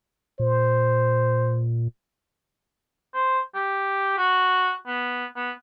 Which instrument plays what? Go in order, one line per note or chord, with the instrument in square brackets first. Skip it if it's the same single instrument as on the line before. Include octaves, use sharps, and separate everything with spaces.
[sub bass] A#2 [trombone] C5
[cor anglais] C5
G4
F#4
B3
B3